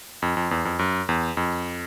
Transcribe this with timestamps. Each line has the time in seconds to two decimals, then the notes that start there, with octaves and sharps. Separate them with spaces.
0.22 F2
0.37 F2
0.51 E2
0.65 F2
0.79 F#2
1.09 E2
1.37 F2